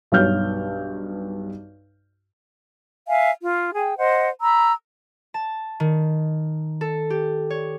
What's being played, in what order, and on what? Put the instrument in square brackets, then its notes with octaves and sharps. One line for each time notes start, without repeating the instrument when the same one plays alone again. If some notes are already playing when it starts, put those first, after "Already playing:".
[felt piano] B1 G2 F#4 C#5 F6 G6
[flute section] E5 F5 G#5
F4
G#4 G5
C5 D#5 F#5
A#5 B5 E6
[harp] A5
D#3
A4
G4
C#5